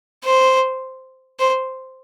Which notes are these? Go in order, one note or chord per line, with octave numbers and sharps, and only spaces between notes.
C5
C5